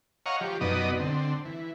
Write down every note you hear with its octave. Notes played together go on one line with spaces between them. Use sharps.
C#5 D#5 F5 F#5 A#5 C#6
F3 G4
F#2 B2 B3 D#4 D5 D#5
D3 C4
E3